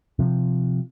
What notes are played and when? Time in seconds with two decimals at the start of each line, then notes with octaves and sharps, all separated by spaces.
0.19 C3 F3